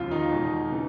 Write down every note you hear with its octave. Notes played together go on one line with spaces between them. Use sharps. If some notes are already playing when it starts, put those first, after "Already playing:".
Already playing: E1 D#2 C#3 F3 F4
D#3 D#4
E2 B2 G#3
C#3 E3